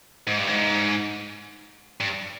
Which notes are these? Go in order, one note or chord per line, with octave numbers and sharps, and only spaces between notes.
G#2
G2
G#2
G2